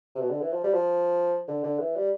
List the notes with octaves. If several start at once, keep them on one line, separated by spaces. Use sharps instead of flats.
C3
B2
D3
E3
F3
G3
F3
D3
D3
E3
G3